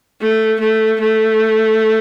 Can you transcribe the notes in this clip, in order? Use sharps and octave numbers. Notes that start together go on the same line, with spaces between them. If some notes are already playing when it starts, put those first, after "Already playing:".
A3
A3
A3